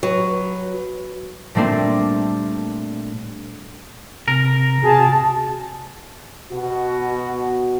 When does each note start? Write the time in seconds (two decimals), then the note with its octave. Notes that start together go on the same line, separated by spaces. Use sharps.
0.03 F#3 B4
1.55 A#2 G3 A3 A#3 C4 D4
4.28 C3 A#4
4.83 C3 F#4 G#4 A5
6.51 B2 F#4